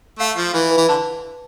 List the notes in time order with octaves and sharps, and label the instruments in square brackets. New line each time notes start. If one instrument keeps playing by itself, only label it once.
[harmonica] A3 [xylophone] F5
[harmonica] F3 [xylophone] F5
[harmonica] E3 [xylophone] B4
[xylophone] B4
[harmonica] E3
[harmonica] D3 [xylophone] A5